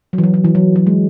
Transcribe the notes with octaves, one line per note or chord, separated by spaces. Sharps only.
F#3
E3
F#3
F#3
E3
F#3
F#3
G#3